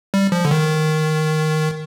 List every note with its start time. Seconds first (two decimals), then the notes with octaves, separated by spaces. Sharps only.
0.14 G3
0.32 F3
0.45 D3
0.51 D#3